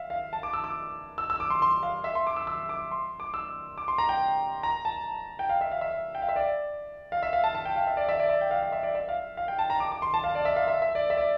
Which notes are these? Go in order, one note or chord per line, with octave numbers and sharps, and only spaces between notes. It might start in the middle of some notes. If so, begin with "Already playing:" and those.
Already playing: E5 F5
F5
A5
D6
E6
D6
E6
E6
D6
C6
C6
F5
E5
C6
D6
E6
E6
D6
C6
D6
E6
D6
C6
A#5
G5
A#5
A5
G5
F5
E5
F5
E5
G5
F5
E5
D5
F5
E5
F5
A5
A5
G5
F5
E5
D5
E5
D5
E5
G5
F5
F5
E5
D5
E5
F5
F5
G5
A5
A#5
D6
D6
C6
A5
F5
D5
E5
F5
E5
E5
D5
E5
D5